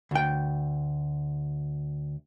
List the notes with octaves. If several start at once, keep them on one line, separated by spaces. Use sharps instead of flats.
D2 G5